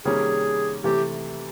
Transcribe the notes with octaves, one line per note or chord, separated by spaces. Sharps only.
C3 D#3 G3 A#3 C#4 G#4
C3 E3 A3 G4